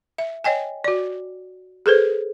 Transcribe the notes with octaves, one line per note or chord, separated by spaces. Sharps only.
E5
C#5 D#5 G5 G#5
F#4 D5
G#4 A4 B4 C5